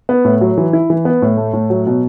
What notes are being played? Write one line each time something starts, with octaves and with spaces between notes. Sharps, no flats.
B3
A2
F#3
E3
E4
E3
B3
A2
A3
A2
F#3
B2